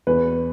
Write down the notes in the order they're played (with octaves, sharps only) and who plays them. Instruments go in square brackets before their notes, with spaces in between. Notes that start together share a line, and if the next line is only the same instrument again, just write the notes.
[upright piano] E2 B4